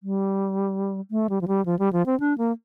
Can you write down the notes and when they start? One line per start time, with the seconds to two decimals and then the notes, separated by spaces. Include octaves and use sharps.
0.03 G3
1.11 A3
1.30 G3
1.41 F3
1.48 G3
1.66 F3
1.79 G3
1.93 F3
2.06 C4
2.20 D4
2.38 A#3